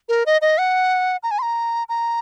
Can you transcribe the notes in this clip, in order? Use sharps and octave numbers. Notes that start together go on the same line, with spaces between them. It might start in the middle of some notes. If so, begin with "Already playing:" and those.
A#4
D#5
D#5
F#5
A#5
G#5
C6
A#5
A#5